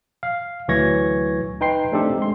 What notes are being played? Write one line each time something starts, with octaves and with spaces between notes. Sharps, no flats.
F5
D2 E3 F#3 C#6 G#6 A#6
D#4 B4 G5 C6 C7
A3 C4 D4 D#4 G4 A4
G#3 C6